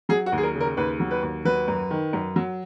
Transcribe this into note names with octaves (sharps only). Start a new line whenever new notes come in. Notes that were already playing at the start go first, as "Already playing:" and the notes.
F#3 G#4
F#4
D#2
G#4
A#4
C#3
A#4
D#2 B4
F#3
B4
D#2
F#3 B4
F#2
D#3
F#2
F#3